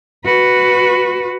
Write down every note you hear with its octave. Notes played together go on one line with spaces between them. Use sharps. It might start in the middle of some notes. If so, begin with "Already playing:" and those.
F#4 B4